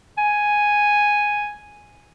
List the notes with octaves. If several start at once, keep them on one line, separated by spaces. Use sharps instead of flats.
G#5